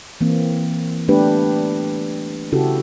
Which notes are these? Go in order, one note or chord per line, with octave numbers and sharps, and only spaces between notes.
E3 A#3 C4
G3 A3 B3 D4 G4 B4
C#3 C#4 E4 F#4 G4 A4